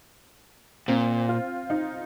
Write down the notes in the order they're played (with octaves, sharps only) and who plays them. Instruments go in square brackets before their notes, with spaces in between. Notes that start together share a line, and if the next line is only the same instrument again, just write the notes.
[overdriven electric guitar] A#2 [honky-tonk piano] C4
[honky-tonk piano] F4
D#4